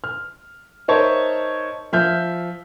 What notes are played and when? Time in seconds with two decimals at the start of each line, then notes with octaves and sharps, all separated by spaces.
0.04 F6
0.88 D#4 A#4 C5 C#5 E5 A5
1.93 F3 E5 F6 G6